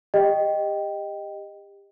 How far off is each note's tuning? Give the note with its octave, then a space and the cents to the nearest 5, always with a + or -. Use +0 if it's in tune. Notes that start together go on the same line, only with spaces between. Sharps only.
G4 +30 D#5 -5 G5 +0